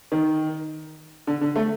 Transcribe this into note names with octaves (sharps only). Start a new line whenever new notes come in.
D#3
D3
D3
A3